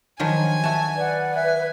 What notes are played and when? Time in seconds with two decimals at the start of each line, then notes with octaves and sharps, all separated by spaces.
0.19 D#3 F3 F#3 G#5
0.64 F#4 E5 A5
0.96 B4 D5 F#5
1.34 E5 G#5